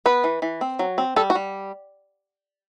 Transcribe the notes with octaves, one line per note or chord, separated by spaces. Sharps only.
B3 B4
E3
E3
C4
F#3
C4
G3 A4
F#4
G3